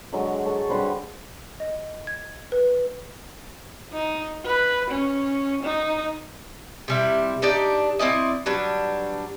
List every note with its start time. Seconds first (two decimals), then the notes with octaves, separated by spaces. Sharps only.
0.13 D3 F#3 G#3
0.46 A4 C#5
0.69 D3 G3 B4 C5
1.60 D#5
2.07 G#6
2.52 B4
3.93 D#4
4.45 B4
4.91 C#4
5.63 D#4
6.88 C3 G3 E4
7.42 D4 D#4 G4 D5
7.99 C4 E4 D5 D#5
8.46 F#3 G3 D4 B4